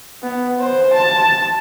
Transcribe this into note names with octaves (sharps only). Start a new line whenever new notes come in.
B3
C5
A5